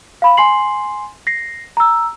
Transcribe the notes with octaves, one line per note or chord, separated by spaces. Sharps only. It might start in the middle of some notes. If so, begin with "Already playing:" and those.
F5 B5
G#5 C6 C7 F#7
A#6 C7
A#5 E6